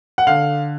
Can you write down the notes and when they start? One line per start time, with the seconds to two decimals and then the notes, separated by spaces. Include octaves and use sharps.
0.18 F#5
0.27 D3 F5